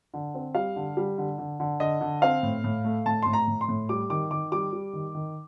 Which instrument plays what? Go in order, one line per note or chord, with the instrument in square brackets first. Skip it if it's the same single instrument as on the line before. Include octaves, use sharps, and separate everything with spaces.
[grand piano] D3
C4
G3 F5
D3
G3
D3
D3
D3
D3 D#5
D3
C4 F5
A2
A2
A3
A2 A5
A2 C6
A#5
A2
C6
A2
G3 D6
D#3 D6
D#3 D6
G3 D6
G3
D#3
D#3